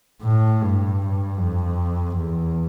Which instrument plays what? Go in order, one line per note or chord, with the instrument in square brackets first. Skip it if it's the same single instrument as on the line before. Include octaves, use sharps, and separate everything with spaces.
[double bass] A2
G2
F2
E2